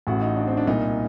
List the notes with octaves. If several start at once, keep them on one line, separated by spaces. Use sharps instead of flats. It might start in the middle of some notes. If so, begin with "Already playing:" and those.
A1 A2 F#4
D#4
D4
C4
D4
C2 A#2 D#4